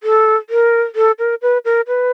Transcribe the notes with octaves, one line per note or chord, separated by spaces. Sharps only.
A4
A#4
A4
A#4
B4
A#4
B4